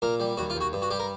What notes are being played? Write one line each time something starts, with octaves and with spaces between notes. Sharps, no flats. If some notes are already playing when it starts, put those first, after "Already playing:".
A#2 A#4
G3
D#2 F#4
F4
D#2
F#4
G2
F#4
G3 G4
A#4